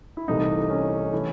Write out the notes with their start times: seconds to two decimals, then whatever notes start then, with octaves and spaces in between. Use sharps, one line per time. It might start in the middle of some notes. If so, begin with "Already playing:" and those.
0.17 E4
0.28 C2 C3 E3 A3 D#4
0.70 C#4
1.12 E3 A3